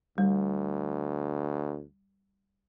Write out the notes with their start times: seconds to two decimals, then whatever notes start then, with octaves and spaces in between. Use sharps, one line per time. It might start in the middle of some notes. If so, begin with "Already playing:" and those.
0.18 D2 G3